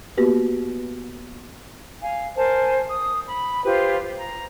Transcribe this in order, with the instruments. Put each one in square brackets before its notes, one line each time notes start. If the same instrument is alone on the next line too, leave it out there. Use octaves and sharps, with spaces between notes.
[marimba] A#3 B3 F#4 G4 B4
[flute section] F5 G#5
A#4 C5 G#5 A5
D#6
B5
F4 G4 B4 C5
A#5